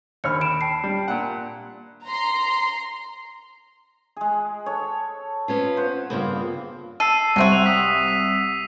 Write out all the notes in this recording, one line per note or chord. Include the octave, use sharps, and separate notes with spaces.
D#2 C#5 B5 F6 C#7
B5 D7 E7
G5 A5 C7
G3
A#2 F#5
A#5 C6
G#3 G#4
A4 C#5
B3 C#4 F4
C5 F#5
G2 C#3 A#3 B3 F4
A4 E6 C7 D#7
C2 F#3 C4 F#4 E5
F7
D#6 E6 B6
B6